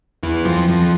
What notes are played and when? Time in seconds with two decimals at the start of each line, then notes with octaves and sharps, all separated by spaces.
0.23 E2 E3
0.45 F2 F3
0.68 F2 F3